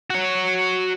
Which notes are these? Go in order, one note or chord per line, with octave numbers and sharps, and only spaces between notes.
F#4 C#5